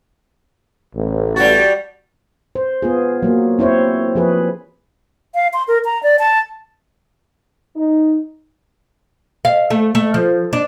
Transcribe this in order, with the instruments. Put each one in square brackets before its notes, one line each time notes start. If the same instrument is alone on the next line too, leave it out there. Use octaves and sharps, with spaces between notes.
[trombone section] A1
[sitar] G3 F#4 [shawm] A5
[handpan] C5
B3 F4 G#4
F#3 A#3
C4 E4 C5 C#5
F3 G#4 B4
[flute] F5
C6
A#4
A#5
D5
A5
[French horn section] D#4
[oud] F5
A3
A3
F3
D4